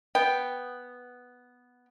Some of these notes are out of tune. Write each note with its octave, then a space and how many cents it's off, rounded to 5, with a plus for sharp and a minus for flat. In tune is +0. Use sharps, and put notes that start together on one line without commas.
B3 +0 G5 +0